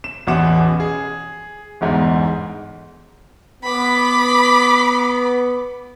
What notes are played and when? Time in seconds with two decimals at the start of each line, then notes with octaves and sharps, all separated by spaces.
0.04 E7
0.27 A1 E2 B2 F#5 D6 E7
0.80 G#4
1.81 G1 E2 G#2
3.63 B3 B5 D6